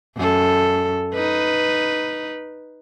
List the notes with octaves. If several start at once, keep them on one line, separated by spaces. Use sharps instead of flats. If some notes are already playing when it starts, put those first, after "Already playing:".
F#2 A4
D#4 B4